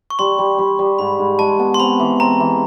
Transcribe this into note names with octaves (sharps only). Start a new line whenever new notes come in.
C#6
G3 C6
G3
G3
G3
G#2 B5
G#2
G#3 A5
B3
C6
C4 B5
E3
C4 A#5
E3